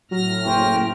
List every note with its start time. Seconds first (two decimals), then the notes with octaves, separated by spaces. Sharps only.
0.11 A2 F#3 F6 A#6
0.45 F#1 C#4 C5 G5